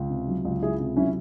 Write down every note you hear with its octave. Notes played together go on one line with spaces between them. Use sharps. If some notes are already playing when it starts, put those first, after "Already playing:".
Already playing: C#2
C3
F#3
C#2
C#2 E4 G#4
C3
F#3 C#4 E4